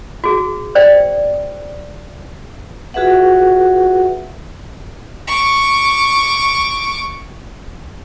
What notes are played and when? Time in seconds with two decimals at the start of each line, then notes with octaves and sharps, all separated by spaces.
0.24 F#4 G#4
0.75 C5 D5 G5
2.94 F4 F#4 G#4 B4 E5 F#5
5.27 C#6 D6